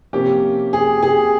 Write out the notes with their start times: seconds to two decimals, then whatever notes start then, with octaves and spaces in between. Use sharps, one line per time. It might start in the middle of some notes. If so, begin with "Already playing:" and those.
0.13 C3 F3 A#3 C#4 G4
0.73 G#4
1.03 G#4